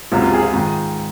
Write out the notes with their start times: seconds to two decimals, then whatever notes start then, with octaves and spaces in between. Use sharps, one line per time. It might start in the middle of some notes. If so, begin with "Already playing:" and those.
0.12 C#2 C3 F#3 F4
0.22 F4
0.32 F4 G#4
0.43 F4 G#4
0.53 G#2 D#3 G#3